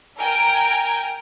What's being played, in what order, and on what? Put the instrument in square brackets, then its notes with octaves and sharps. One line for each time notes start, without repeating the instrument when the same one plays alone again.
[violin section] A#4 G5 G#5 A#5